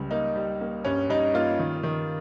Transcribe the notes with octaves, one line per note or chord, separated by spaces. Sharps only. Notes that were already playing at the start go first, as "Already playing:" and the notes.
Already playing: C#2 G3
A#3 D#4
G3
A#3
G2 C#4
G2 D#4
A#3 F4
D#3
D#3